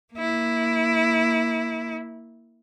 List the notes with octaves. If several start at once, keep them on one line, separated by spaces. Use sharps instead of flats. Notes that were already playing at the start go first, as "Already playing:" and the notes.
A#3 E4